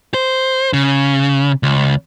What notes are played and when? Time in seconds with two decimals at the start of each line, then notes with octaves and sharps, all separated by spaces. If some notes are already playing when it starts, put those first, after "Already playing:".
0.14 C5
0.73 C#3
1.63 C#2